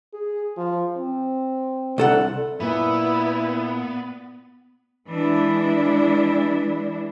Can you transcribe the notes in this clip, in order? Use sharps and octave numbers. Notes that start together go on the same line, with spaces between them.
G#4
F3
C4
C2 D3 A4 F#5
A#2 A#3 B3 E4
E3 G#3 D4 E4